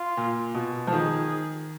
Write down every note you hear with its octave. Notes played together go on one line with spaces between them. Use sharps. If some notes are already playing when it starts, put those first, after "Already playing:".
Already playing: F4
A#2
B2
F3
D#3 G#4